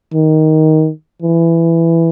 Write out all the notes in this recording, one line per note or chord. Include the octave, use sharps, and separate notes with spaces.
D#3
E3